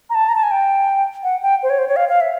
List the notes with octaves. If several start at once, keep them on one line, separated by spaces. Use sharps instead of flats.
A#5
A5
A#5
A5
G#5
G5
F#5
G5
C5
C#5
C5
C#5
F5
F5
E5